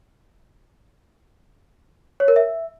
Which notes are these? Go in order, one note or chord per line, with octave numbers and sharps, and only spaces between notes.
C#5
A#4
E5